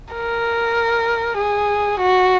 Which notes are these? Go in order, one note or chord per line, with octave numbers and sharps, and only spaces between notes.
A#4
G#4
F#4